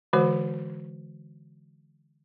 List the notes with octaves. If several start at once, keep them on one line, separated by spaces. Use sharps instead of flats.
D3 E3 G#3 F#4 C5